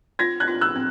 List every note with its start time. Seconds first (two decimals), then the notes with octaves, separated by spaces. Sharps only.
0.19 F4 G#6 A#6
0.40 F#6 G#6
0.48 F4
0.61 E6 F#6
0.76 C4